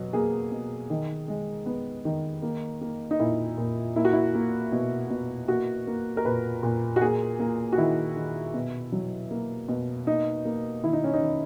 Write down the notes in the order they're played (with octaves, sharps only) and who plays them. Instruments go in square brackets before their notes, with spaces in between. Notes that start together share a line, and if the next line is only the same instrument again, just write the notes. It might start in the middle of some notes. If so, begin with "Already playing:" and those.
Already playing: [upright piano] B2 F#3
A#3 G#4
B2
D#3
G#3
B3
D#3
A#3
A#3
D#4
A#2 E4
A#2
A#3 E4
F#4
E4
A#3
B2
B2
A#3 F#4
A#3
A#4
A#2 B4
A#2
F#4
A#3 G#4
A#3
F#4
D#3 E4
D#3
B2
F#3
A#3
B2
A#3 D#4
A#3
D#3 E4
D#4
C#4
D#4
D#3